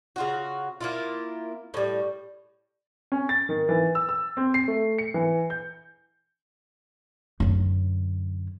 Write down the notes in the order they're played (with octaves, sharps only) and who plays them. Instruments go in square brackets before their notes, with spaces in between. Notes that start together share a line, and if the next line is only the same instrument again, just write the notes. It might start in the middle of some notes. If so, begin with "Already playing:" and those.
[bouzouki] C#3 F4 F#4
A#3 E4 F4
A2 G3
[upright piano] C#4
A6
D#3
E3
E6
E6
C4
C7
A3
C#7
E3
G6
[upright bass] F#2 D3